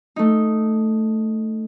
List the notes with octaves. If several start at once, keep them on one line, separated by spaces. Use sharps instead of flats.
A3 D#4